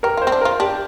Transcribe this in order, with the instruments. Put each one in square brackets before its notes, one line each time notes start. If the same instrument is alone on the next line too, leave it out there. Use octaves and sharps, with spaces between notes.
[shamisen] G4 [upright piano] A#4
[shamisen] F4
[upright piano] C5
[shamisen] C4
D4
[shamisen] F4 [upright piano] A#4
[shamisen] D4 [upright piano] G4